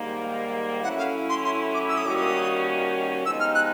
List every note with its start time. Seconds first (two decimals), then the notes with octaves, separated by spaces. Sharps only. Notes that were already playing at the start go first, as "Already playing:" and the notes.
Already playing: G#2 D#3 G3 A#3
0.83 A2 F#3 A3 C#4 E4 F#5
0.98 F5
1.29 C6
1.44 C6
1.74 D6
1.89 E6
1.98 D#6
2.04 D#3 G3 A#3 C#4 F#4 D6
2.15 D#6
3.25 F3 G#3 B3 D#4 G4 E6
3.40 F6
3.55 F#6